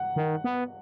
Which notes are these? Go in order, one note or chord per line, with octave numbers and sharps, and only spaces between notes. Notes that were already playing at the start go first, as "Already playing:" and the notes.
Already playing: F#5
D#3
B3